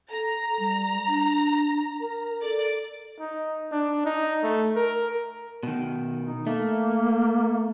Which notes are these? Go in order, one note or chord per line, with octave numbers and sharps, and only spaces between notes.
A4 A#5
G3
D4
A#4
A4 D5
D#4
D4
D#4
A3
A#4
B2 D#3
D#4
A3 A#3